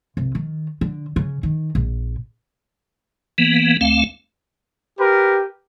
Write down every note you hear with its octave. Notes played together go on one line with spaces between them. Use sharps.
C2
D#3
D3
C#3
D#3
A#1
E3 A#3 B3
D2 A3 C4 F5
G4 A#4 B4